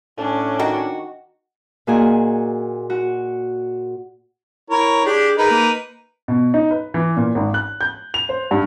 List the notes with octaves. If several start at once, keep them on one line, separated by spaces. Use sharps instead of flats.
A2 C#4 D4
D#3 F#4
A#2 A#3 F#4 G#4 D#5 G#5
F#4
E4 A#4 C#5
D4 G4 G#4
D#4 G#4 A#4 B4
A#3
B2
D#4
B4
E3
A#2
G#1
F#6
G6
F7
C5
G2